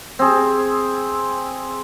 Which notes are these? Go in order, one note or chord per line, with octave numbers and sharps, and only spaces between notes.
C4 G#4